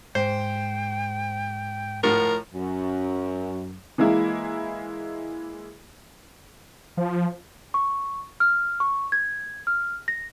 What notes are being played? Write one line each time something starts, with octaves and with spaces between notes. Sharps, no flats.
G#2 C5 G5
A2 F3 A#4 F#5
F#2
E3 G#3 A#3 E4
F3
C#6
F6
C#6
G#6
F6
A#6